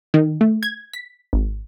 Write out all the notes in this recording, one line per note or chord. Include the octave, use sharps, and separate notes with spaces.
D#3
A3
G#6
B6
G#1